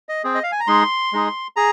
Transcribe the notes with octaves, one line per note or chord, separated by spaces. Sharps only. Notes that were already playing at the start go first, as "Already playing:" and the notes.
D#5
C4 G#4
D#5
F5
G#5
A#5
G#3 D#4 G#4 C6
G#3 D#4 G#4
G#4 A#5